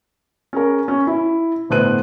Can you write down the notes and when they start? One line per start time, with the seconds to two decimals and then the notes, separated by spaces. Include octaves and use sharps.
0.53 C#4 G#4 A#4
0.88 C#4
1.07 E4
1.70 G1 A2 B3 C5 F#6 D#7